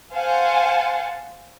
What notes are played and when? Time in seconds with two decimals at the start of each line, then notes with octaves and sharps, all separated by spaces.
0.12 C5 F5 F#5 G#5 A5